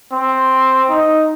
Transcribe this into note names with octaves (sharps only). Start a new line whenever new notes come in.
C4
D#4